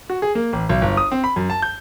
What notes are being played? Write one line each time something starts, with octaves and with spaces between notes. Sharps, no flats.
F#4
G#4
A#3
A1
B1
G1
D#6
C4
B5
F#2
A5
G6